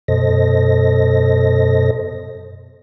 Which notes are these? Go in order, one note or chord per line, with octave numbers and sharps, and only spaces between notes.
F#2 B2 A4 C5 D#5 A#6